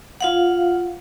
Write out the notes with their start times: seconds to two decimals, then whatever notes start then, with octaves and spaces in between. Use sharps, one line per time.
0.21 F4 F5 F#5